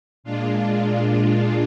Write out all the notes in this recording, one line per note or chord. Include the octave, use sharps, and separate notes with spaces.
A#2 G#3 D4 F4
D4 F4